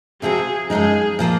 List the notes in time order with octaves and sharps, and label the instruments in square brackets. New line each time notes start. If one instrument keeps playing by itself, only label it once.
[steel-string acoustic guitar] C3 F3 C4 F#4 [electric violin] G#4
[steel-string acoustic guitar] F#2 F3 G#3 D#4 [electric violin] G#4
[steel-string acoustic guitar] A#2 F3 A#3 F4